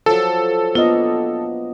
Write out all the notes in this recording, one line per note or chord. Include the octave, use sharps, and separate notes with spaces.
F3 F#3 A4
A#3 B3 D4 F4 D#5